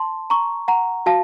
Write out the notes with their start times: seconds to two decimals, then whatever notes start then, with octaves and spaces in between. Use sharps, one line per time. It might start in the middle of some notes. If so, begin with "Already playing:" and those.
Already playing: A5 C6
0.30 A#5 C#6
0.68 F#5 A#5
1.06 F#4 F5 A5